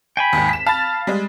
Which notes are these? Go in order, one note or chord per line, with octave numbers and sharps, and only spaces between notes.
G5 G#5 B5
D#2 G#2
B6 E7
F5 A5 B5 A6
G3 G#3